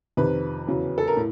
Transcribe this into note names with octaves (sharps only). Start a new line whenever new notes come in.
F2 C3 D#3 B4
E2 C#3 F#3
A4
A#4
A2